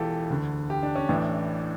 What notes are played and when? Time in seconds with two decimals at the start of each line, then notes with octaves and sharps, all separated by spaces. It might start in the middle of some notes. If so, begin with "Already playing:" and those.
Already playing: E1 E2 E3 F4 G4 A4
0.30 D2 D3
0.70 G4
0.83 D4
0.96 C#4
1.09 A1 A2 E3 D4